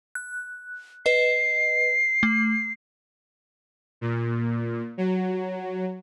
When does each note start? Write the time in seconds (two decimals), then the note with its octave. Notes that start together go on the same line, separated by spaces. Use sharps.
0.15 F#6
1.06 B4 D#5 C7
2.23 A3
4.01 A#2
4.98 F#3